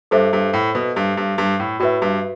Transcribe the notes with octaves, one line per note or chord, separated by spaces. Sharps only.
G2 A4 C5 E5
G2
A2
B2
G2
G2
G2
A2
A2 F#4 B4 E5
G2